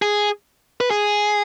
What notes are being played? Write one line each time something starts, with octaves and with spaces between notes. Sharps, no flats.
G#4
B4
G#4